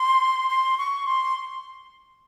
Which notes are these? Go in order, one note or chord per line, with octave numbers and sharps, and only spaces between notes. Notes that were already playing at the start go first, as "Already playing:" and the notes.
Already playing: C6
C6
C#6
C6